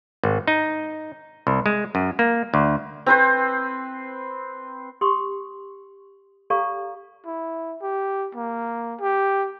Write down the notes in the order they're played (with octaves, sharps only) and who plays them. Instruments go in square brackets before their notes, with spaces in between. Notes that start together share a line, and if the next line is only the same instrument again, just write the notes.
[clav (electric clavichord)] G#1
D#4
C2
G#3
F#2
A#3
D2
[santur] C4 B4 C5
[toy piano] G4 C6 C#6 D#6
G4 A4 D5 F5 A#5 C#6
[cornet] E4
G4
A#3
G4